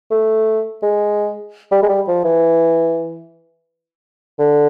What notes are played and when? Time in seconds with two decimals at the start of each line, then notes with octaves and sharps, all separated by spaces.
0.11 A3
0.83 G#3
1.72 G3
1.83 G#3
1.89 G3
2.08 F3
2.25 E3
4.39 D3